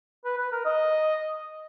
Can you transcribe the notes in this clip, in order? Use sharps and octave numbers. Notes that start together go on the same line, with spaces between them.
B4
B4
A#4
D#5